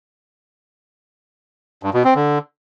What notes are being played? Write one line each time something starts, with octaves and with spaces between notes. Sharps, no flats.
G2
B2
C4
D3